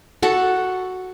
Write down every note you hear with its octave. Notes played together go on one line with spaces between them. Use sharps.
F#4 A4 F#5